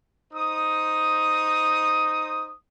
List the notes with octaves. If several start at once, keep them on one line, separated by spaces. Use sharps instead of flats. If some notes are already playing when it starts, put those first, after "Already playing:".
D#4 C5 D#6